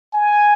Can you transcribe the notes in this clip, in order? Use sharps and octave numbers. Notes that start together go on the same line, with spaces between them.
G#5